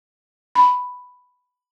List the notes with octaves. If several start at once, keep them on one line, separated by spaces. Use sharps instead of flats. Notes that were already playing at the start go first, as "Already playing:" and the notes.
B5